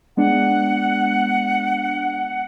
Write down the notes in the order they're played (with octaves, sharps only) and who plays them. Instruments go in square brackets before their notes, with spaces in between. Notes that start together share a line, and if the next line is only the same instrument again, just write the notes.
[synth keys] G#3 B3 D4 [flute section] F#5